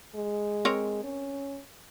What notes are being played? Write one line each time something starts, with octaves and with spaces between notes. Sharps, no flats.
G#3
C4 A#4 C#5
C#4